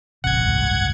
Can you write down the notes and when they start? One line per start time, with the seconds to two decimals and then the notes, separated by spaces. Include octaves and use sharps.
0.24 D#1 A1 C3 F#5 G#6
0.46 F#1 C2 G#2